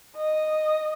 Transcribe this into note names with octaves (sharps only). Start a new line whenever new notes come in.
D#5